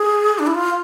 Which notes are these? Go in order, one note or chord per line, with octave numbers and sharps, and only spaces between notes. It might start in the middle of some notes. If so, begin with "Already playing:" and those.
Already playing: G#4
D4
E4
F4